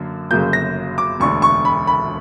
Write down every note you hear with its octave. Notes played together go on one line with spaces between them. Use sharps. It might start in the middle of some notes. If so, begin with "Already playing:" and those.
Already playing: F#2 D3 A#3
G1 F#2 C#3 F#3 A#3 G6
A#6
D6
E1 D2 D3 C#6
C#6
B5
B5